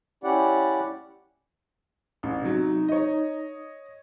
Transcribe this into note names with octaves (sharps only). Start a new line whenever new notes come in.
C#4 E4 G4 D5 F#5
A1
C3 F#3 D#4
C#5 D#5